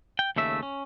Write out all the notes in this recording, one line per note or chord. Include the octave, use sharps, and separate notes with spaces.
G5
D#2 C#3 A3 E5
C#4